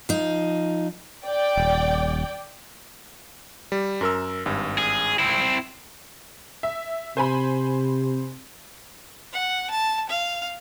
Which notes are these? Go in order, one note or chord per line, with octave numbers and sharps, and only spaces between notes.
F3 D#4
D5 G5
D#1
G3
F#2 A#4 E6
G#1 G2
G#4
C4 E4
E5
C3 C5 G#5 B5
F#5
A5
F5